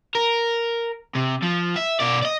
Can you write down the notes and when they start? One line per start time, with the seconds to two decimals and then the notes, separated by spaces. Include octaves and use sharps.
0.15 A#4
1.15 C3
1.43 F3
1.76 E5
2.00 B2 D5
2.22 D5 D#5